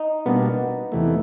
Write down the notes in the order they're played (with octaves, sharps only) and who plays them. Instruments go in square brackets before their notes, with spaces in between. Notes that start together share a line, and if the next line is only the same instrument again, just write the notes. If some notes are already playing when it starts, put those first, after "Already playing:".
Already playing: [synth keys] D#4
[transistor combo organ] B2 G3 A#3 D4 [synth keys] B3
[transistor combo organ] E2 C3 E3 A3